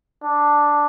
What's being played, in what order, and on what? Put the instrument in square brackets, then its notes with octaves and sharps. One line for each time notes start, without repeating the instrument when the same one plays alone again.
[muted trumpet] D4